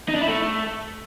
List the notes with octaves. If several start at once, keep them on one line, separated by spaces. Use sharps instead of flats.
D#4
D4
E4
A3